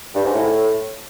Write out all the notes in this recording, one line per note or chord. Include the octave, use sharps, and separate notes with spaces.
G2
G#2
A2